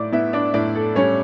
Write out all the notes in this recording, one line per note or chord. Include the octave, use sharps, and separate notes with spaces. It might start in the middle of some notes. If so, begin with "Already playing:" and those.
Already playing: A2 D5 D6
B3 E4 E5
D4 D5
A2 D4 D5
A4
G3 C#4 C#5